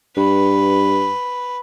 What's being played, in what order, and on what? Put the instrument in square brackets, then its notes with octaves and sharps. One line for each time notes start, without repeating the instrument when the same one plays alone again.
[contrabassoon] G2 [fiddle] B4